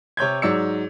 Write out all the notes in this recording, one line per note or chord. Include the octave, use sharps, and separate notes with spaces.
C3 C#5 G6 G#6
G#2 F#3 C#5 D5 E6 C#7